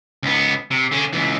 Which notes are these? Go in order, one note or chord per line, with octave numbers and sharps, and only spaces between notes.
C#2 B3
C3
D3 C#4
C#2 E3